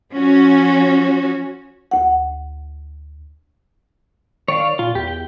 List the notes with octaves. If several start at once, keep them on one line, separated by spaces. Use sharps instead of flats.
F3 C#4 F#4
D2 F#5
D#3 C#5 D5 F5
A#2 F4
E2 G4
G5